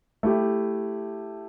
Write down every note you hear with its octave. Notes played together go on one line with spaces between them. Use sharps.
A3 E4 G4